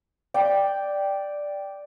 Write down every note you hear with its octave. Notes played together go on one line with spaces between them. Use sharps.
D5 G5